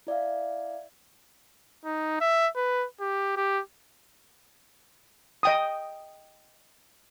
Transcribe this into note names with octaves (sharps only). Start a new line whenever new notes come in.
E4 D5 E5 F5
D#4
E5
B4
G4
G4
D#5 G5 D#6